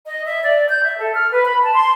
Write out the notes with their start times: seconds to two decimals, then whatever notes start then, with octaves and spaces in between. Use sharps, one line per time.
0.06 D#5
0.26 E5
0.42 D5
0.69 G6
0.84 E5
0.98 A4
1.14 F6
1.31 B4
1.45 B5
1.63 A5
1.74 C6